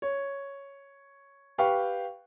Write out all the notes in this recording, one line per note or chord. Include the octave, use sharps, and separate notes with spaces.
C#5
G4 B4 F5 G5 C#6